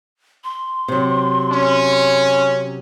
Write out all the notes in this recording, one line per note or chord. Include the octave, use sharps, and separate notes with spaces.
C6
C3 F#3
C#4